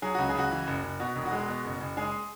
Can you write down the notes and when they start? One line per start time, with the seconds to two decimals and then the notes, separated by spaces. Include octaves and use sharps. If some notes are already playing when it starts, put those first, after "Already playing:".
0.02 F#3 G#4
0.15 C#2 F#4
0.29 G#4
0.35 C#2 F#4
0.51 E3
0.67 F#1
0.83 F#1
1.00 B2 F#4
1.16 E1
1.26 F#4
1.32 G#3
1.48 B2
1.64 F#1
1.80 F#1
1.97 G#3 G#4